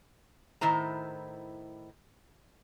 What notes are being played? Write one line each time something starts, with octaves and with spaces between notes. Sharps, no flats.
A2 D#3 E4 C5 A#5